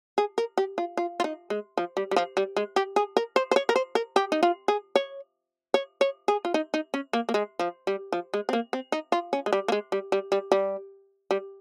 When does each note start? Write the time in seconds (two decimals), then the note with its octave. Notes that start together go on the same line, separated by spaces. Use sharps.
0.18 G#4
0.38 A#4
0.58 G4
0.78 F4
0.97 F4
1.20 F4
1.24 D#4
1.50 G#3
1.78 F3
1.97 G3
2.11 G3
2.16 F3
2.37 G3
2.56 G#3
2.76 G4
2.96 G#4
3.17 A#4
3.36 C5
3.51 C5
3.56 C#5
3.69 A#4
3.76 C5
3.95 A#4
4.16 G4
4.32 D#4
4.43 F4
4.68 G#4
4.96 C#5
5.74 C#5
6.01 C#5
6.28 G#4
6.45 F4
6.54 D#4
6.74 D#4
6.94 C#4
7.13 A#3
7.29 A#3
7.34 G#3
7.59 F3
7.87 G3
8.13 F3
8.34 G#3
8.49 C4
8.53 A#3
8.73 C4
8.92 D#4
9.12 F4
9.33 C#4
9.46 G#3
9.53 G3
9.68 A#3
9.72 G#3
9.92 G3
10.12 G3
10.32 G3
10.52 G3
11.31 G3